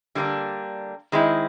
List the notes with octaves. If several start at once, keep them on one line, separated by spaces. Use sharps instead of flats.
D3 G3 A#3 D4
D#3 G#3 C4 E4